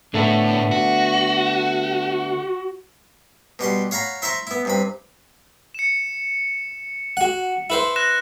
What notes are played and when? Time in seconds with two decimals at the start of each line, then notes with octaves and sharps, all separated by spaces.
0.14 A2 D3 A3 B3
0.71 F#4
3.59 B2 G3 F#5 C6
3.91 C#5 F5 F#5 A#5 B5
4.22 E4 C5 E5 A#5 C6 C#6
4.47 B3 E4
4.65 G2 C3 B5
5.74 C#7 E7
7.17 F#4 F#5
7.70 E4 B4 C5
7.96 F#6 A#6 E7